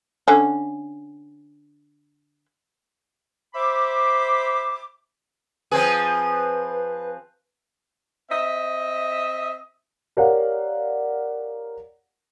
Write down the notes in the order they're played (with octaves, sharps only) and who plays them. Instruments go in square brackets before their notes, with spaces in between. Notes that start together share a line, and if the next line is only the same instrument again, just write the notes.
[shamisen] D3 C#4
[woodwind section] C5 E5 B5 D6
[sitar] F3 C4 G#4 [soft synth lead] B4
[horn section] C4 D#5 E5
[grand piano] G4 A#4 C#5 D5 F5 F#5